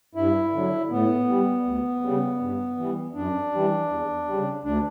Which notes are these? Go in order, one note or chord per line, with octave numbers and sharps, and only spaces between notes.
G2 E4
D3 F#3
A2 B3
G3
D2
C#3 G3
G2
E3 G3
F#2 D4
E3 G3
E2
C#3 G3
D2 D4